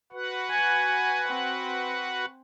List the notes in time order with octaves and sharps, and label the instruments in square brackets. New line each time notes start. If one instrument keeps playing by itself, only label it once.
[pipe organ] F#4 B4 F#5
[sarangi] G#5
C4